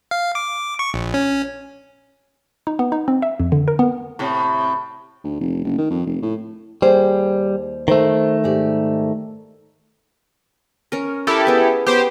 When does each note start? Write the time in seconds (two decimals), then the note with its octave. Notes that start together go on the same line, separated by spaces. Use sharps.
0.11 F5
0.35 D6
0.79 C#6
0.94 A#1
1.14 C#4
2.67 D#4
2.79 B3
2.92 D#4
3.08 C4
3.22 E5
3.40 F2
3.52 D3
3.68 A#4
3.79 B3
4.19 A2 C3
5.24 D2
5.40 F1
5.65 F#1
5.78 D#3
5.90 F2
6.06 F1
6.22 A2
6.82 D#2 G3 G#4 C5
7.88 D#3 A3 A4 C5
8.44 G#2 G4 D5
10.92 C#4 A#4
11.27 E4 G4 A4 A#4
11.47 B3 G#4
11.86 B3 G4 C5